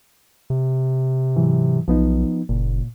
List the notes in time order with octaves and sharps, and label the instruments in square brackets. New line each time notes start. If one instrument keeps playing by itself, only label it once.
[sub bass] C3
[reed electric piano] G#2 E3 F#3
[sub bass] B1 [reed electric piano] F3 B3 D#4
[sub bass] F#1 [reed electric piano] A#2